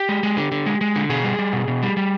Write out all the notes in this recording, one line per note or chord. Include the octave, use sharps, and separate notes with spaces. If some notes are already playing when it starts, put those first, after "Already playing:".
Already playing: G4
G#3
G#3
D3
D3
G#3
G#3
D3
B2 G#4
G3
G3
B2
B2
G3
G3